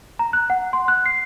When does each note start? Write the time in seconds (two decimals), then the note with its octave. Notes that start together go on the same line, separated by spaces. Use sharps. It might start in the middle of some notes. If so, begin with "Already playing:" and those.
0.19 A#5
0.33 F#6
0.50 F#5
0.73 C6
0.88 F#6
1.06 C7